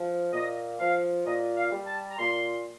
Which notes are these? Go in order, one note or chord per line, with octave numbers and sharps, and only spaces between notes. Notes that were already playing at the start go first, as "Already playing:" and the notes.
Already playing: F3
A#2 D#5
F3 F5
A#2 D#5
F5
G3
A5
A#5
A#2 C6